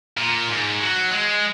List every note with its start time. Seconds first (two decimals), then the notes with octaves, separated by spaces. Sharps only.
0.18 A#2
0.49 G#2
0.80 F#3
1.11 G#3